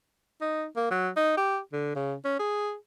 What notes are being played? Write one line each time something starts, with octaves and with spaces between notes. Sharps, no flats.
D#4
A#3
F#3
D#4
G4
D3
C#3
C#4
G#4